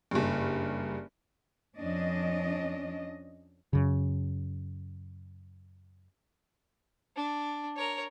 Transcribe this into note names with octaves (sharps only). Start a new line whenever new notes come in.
F#1 G2
F2 C#4 D4 D#5
F#2 C#3
D4
A#4 C#5